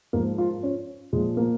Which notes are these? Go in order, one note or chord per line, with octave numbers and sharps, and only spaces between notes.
G#2 F3 A#3
F4
C#4
A#2 F3 G#3
A#3